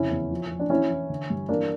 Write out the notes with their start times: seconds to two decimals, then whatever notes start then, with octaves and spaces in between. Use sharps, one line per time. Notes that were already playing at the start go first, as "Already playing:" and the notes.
Already playing: F2 C#3 C#4 E4
0.11 E2
0.31 F3
0.50 F3
0.59 D4
0.70 E3 C#4 E4
0.90 E3
1.10 D3
1.30 G2
1.49 E3 A#3 D4